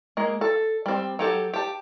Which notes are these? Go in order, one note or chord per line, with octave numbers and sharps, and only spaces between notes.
G#3 A#3
A4
G3 C4
F#3 G4 A4
G4 A5